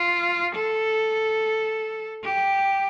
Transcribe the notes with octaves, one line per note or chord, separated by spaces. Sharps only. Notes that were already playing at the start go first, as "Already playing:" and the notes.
Already playing: F4
A4
G4